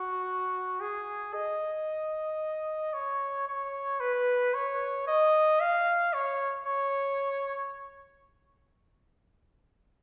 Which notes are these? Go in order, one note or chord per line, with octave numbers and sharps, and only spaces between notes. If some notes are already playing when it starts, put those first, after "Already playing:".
Already playing: F#4
G#4
D#5
C#5
C#5
B4
C#5
D#5
F5
C#5
C#5